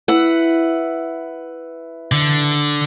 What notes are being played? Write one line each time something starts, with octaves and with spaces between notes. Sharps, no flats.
E4 B4 F#5
D3